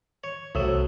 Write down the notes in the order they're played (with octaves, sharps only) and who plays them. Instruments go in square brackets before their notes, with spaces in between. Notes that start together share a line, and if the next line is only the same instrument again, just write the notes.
[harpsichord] C#5
[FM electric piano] C2 E6 [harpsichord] A2 F#3